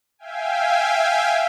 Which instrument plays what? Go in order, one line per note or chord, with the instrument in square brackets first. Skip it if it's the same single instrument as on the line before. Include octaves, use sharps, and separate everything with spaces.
[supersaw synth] E5 F5 G5 G#5